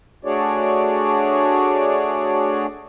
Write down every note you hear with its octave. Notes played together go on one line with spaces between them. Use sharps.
A3 D4 F#4 G#4 C#5 D5